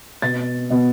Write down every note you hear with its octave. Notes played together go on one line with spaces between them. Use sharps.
B2 B3 A6
B2 B3